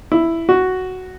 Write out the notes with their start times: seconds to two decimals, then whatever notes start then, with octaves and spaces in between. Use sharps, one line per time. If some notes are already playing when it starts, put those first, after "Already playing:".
0.12 E4
0.49 F#4